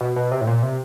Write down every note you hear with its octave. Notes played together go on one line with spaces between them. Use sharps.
B2
B2
C3
A2
A#2
C3